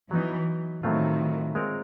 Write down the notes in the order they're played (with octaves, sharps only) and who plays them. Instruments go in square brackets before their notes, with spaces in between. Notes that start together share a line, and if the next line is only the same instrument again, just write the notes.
[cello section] E3 [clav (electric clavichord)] F#3 B3 D#4
[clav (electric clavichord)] A2 F#3 A3 C4 F4 [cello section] D#3
[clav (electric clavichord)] G#3 C4 F4 A#4 C#5